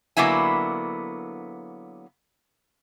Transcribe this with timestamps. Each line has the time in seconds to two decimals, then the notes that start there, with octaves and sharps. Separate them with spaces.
0.17 D3 F#3 A#3 B3 E4 G#5